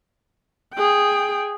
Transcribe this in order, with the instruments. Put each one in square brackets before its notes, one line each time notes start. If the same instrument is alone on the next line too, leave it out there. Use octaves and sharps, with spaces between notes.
[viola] G#4 G5